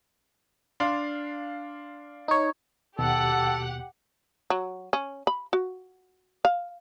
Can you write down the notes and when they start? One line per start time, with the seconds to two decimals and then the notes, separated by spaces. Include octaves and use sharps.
0.80 D4 F5 C6
2.28 D#4 C#5
2.99 D#2 B2 G4 A4 F#5
4.50 F#3
4.93 C#4
5.27 B5
5.53 F#4
6.45 F5